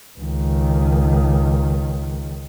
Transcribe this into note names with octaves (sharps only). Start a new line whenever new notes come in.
C#2 D#3